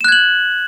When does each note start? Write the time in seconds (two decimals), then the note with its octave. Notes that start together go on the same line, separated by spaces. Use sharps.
0.01 E7
0.04 F#6
0.08 G#6
0.12 F#7